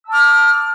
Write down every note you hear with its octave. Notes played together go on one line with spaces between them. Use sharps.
A5 D6 E6 F6